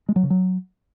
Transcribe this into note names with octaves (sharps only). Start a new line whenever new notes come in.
G#3
F#3
C#3
F#3